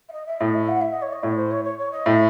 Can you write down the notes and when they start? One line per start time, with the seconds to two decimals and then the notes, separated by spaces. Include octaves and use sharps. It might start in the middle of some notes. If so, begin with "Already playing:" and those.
0.09 E5
0.12 D#5
0.26 E5
0.40 A2 D#5
0.54 E5
0.68 F#5
0.81 E5
0.93 D#5
1.02 C#5
1.13 D#5
1.23 A2 C#5
1.36 C5
1.51 C#5
1.65 C#5
1.79 C#5
1.92 D#5
2.06 A2 E5